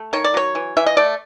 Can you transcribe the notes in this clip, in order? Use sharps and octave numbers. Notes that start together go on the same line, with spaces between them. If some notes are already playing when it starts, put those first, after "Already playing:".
Already playing: A3
D#3 C#5
D5
F#3 C#5
E3
E3 E5
D#5
A3 D5